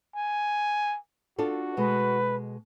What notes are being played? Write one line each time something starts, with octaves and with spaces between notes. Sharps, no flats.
G#5
D4 F4 F#4 A4
B2 G#3 B4